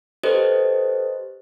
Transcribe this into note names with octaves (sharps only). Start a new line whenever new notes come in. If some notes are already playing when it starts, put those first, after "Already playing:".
G4 A4 B4 C5 D#5